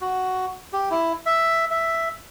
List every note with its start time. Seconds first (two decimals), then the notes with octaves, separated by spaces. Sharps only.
0.01 F#4
0.73 G4
0.91 E4
1.26 E5
1.71 E5